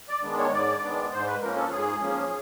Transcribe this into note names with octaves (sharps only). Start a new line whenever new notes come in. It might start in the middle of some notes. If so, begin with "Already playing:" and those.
D5
D#3 G#3 B3 D4
C#5
G#2 D5
D#3 G#3 B3 D4
G#2 C5
B4
F3 A#3 C#4 A#4
A4
G#2 G#4
F3 A#3 C#4